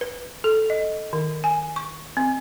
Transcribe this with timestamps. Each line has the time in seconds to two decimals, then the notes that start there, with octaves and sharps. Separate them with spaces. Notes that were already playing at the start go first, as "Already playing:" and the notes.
0.01 B4
0.44 A4
0.70 D#5
1.13 D#3
1.44 G#5
1.76 C#6
2.17 C4